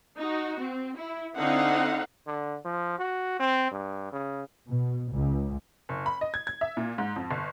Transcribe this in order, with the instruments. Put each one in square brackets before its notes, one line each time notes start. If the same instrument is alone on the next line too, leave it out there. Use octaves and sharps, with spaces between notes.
[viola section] D#4 F#4
C4
E4
D3 C4 D#4 E4 F5 F#5
[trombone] D3
F3
F#4
C4
G2
C#3
[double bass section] B2
C#2
[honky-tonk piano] F#1
B5
D#5
G#6
G#6
E5
A#2
G#2
F2
G1